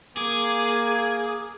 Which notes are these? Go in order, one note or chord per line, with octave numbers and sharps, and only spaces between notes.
A#3 G#4 G#5 D6